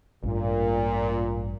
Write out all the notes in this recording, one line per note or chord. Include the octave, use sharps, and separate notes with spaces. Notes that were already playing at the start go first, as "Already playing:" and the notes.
A1 G2 A#2